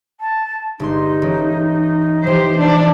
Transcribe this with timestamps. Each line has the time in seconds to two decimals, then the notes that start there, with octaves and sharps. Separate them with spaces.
0.20 A5
0.80 G1 G#3 D#4 C6
1.22 A1
2.24 E3 F3 G4 C5
2.59 D4